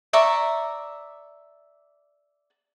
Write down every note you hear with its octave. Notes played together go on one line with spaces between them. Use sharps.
D5 E5 A#5 C#6